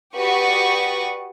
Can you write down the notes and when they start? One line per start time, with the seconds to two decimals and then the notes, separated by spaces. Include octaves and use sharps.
0.16 F#4 G4 B4 D5 C#6 D#6